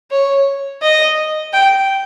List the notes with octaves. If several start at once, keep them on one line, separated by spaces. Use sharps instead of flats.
C#5
D#5
G5